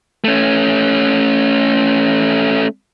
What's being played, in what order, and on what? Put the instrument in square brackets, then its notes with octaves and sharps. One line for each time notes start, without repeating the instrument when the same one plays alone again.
[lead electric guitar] A3 C#4